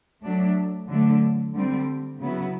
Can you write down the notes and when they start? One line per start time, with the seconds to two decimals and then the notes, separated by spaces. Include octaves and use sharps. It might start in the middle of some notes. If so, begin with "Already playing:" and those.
0.23 F#3 A3 D4
0.89 D3 F#3 A3 D4
1.55 D3 G3 C4
2.20 C#3 F#3 B3 E4